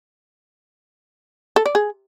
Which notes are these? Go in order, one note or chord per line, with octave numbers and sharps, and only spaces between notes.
A4
D5
G#4